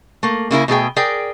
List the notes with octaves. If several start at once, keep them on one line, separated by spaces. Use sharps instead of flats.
A3 A#3
C#3 A#3 E4 A#4
B2 A3 G#4 G5
G#4 A#4 D5 G5